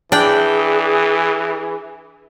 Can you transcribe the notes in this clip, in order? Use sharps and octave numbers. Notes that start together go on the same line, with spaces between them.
E3 D4 G#4 D5 G5